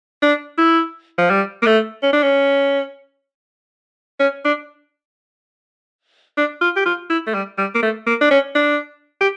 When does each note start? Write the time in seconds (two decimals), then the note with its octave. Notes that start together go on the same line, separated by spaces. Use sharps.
0.22 D4
0.58 E4
1.18 F3
1.30 G3
1.62 A#3
1.67 A3
2.03 C#4
2.13 D4
2.22 C#4
4.20 C#4
4.45 D4
6.37 D4
6.61 F4
6.76 G4
6.86 F4
7.10 E4
7.27 A3
7.34 G3
7.58 G3
7.75 A#3
7.82 A3
8.06 A#3
8.21 D4
8.31 C#4
8.55 D4
9.21 G4